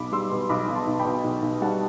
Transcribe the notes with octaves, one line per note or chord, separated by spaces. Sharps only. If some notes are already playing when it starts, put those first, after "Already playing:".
Already playing: B1 B2 B5 D6
G3 C6 E6
B2
B1 B5 D6
B1
A5 C6
B1
G5 B5
B2
B1
B1
G3 F#5 A5